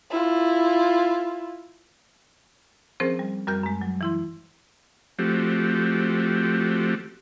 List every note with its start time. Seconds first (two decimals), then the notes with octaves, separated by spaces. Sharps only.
0.10 E4 F4
3.00 F3 C4 C#4 G#4 A#4 C5
3.19 G3
3.47 F#2 G3 F#4 A#4 F6 G6
3.63 F#2 G#3
3.81 F#3
4.01 E3 E4 C6
5.19 F3 A3 C4 F#4 G4